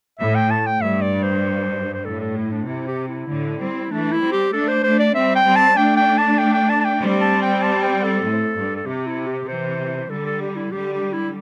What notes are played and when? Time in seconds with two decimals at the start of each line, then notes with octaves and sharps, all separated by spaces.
0.19 A2 E5
0.35 G5
0.51 A5
0.66 G5
0.81 G2 E5
1.02 D5
1.23 C5
1.94 C5
2.05 A2 A4
2.21 A4
2.36 E4
2.52 D4
2.67 C3 E4
2.88 G4
3.08 E4
3.29 A2 D3
3.59 G3 C4
3.90 E3 A3 D4
4.12 E4
4.22 G3 C4
4.32 G4
4.53 A3 D4 A4
4.68 C5
4.83 A3 D4 C5
4.99 D5
5.15 G3 C4 E5
5.35 G5
5.45 G3 C4
5.56 A5
5.77 A3 D4 G5
5.97 G5
6.18 A5
6.38 G5
6.54 G5
6.69 A5
6.81 A5
6.85 G5
7.00 G3 C4
7.21 A5
7.42 G5
7.62 A5
7.83 G5
8.03 A4
8.25 A2
8.56 G2
8.76 A4
8.86 C3 G4
9.07 E4
9.27 G4
9.47 C3 E3 C5
10.10 D3 G3 A4
10.25 A4
10.41 G4
10.56 E4
10.72 D3 G3 G4
10.93 G4
11.13 E4